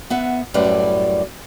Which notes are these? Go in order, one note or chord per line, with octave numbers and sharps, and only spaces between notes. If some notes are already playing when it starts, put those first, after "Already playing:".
B3 E5 F#5
F#2 A2 G3 B4 D5